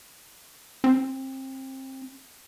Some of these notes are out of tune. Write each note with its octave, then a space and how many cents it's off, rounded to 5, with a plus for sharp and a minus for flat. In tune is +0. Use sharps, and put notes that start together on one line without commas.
C4 +25